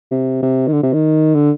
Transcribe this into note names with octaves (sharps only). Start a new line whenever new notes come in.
C3
C3
D#3
D3
C3
D#3
D3